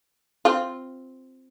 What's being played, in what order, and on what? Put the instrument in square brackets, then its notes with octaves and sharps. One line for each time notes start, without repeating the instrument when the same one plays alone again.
[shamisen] C4 F4